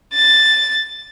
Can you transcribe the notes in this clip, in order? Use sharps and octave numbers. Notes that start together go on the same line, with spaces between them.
A6